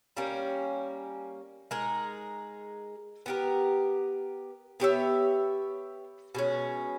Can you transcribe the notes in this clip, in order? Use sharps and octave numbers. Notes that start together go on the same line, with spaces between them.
G3 A#3 C#4
G#3 D#4 A#4
B3 G4 A#4
B3 G4 C#5 E5
B2 G#3 C#4